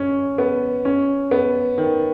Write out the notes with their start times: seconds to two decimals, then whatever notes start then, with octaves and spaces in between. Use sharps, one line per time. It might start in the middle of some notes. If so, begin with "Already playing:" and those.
Already playing: C#4
0.38 B3
0.85 C#4
1.31 B3
1.78 D#3